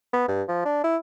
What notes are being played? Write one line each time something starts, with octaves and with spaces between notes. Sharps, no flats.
B3
G2
F3
D4
E4